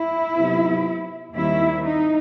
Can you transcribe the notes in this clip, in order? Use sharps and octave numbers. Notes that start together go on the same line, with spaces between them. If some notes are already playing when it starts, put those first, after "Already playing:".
Already playing: E4
C3 F#3 B3
D#2 D#3 G3 C4 E4
D#4